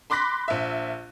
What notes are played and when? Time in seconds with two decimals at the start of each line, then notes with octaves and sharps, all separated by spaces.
0.10 B5 C6 D6 F#6 A#6 B6
0.48 A#1 E5